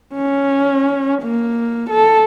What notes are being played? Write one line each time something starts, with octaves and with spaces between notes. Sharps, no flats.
C#4
A#3
A4